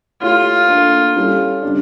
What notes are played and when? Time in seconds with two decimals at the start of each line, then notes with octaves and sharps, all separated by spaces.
0.22 A3 E4 F4 G4 C#5
0.68 A#3 D4 A4
1.16 G3 C#4 E4 A4
1.62 C#3 G3 D4